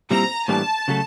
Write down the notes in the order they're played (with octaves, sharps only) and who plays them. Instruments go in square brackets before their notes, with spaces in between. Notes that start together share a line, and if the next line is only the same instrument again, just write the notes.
[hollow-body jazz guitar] A#2 G3 C4 E4 [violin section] A#5
[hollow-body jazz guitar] A2 E3 G3 A#3 D4 [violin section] A5
[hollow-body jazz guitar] C#3 F#3 A3